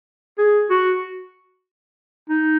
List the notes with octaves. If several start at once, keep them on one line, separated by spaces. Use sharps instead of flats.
G#4
F#4
D#4